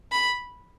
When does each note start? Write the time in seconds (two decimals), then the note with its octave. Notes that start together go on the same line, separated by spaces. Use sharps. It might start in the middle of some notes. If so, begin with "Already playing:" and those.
0.11 B5